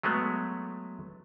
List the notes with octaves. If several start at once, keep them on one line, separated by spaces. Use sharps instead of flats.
F#3 G#3 A3 B3